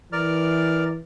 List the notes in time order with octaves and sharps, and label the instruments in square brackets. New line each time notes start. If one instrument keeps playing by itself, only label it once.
[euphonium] E3 [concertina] A#4 D5 F6